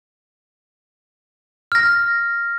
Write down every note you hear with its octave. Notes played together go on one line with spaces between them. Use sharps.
F6 A#6